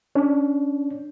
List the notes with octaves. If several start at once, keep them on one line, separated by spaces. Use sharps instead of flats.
C#4 D4